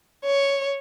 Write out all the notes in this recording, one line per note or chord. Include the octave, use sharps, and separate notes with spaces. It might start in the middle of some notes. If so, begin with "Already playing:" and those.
C#5